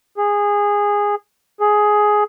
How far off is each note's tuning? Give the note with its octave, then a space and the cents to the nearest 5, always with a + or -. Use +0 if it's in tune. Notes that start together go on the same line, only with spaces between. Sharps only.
G#4 -15
G#4 +10